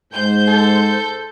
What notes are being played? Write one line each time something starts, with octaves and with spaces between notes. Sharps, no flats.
G#2 C5 G6
A4